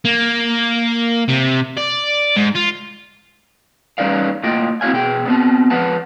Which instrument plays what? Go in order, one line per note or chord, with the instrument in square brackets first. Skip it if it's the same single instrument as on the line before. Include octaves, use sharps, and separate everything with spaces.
[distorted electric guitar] A#3
C3
D5
G#2
F4
[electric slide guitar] G3 C#4 D#4 B4 D5 F5
A2 A#3 F4 D#5 G5
C4 E4 F#4 D5 F5 G#5
B2 G#4 G5
B3 C4 A5
F3 B4 F#5 A5